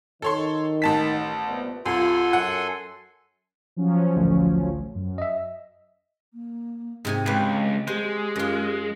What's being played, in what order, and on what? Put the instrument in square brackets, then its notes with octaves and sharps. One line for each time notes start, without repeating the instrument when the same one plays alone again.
[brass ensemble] D#3 [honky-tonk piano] A4 C#5 C6
[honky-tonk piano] A1 A5 B6
[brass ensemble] C2 A#2 B3
[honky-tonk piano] C2 [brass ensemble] F4 [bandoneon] A4 G#5 C6
[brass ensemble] F#2 [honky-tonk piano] F#5
[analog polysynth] F3 F#3 C#4
[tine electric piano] A1 D2
[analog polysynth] F#2
[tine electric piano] D#5 E5
[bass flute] A#3
[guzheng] G#2 C3 G#5
[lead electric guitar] C#2 [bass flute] G#3 [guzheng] G4 B4
[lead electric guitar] G#3 [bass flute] G4 [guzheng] C5
[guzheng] F#2 F4